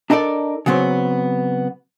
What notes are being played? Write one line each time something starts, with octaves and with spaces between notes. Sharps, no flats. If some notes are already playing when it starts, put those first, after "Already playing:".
D4 D#4 A4 A#4 D5
C#3 F#3 B3 C4 C#5